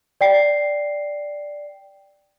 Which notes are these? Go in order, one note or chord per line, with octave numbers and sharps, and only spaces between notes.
D5 G5 C7